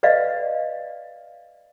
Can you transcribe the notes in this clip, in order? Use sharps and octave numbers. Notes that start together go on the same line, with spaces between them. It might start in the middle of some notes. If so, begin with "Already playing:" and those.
B4 D5 D#5 F5